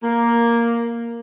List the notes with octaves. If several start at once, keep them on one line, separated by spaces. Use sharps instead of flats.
A#3